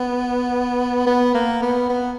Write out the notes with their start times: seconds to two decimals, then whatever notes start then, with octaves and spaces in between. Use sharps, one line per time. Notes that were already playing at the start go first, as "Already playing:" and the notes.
Already playing: B3
1.07 B3
1.34 A#3
1.62 B3
1.90 B3